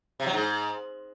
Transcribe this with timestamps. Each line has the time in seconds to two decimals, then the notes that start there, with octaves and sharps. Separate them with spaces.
0.20 C3
0.26 F#3
0.33 G#2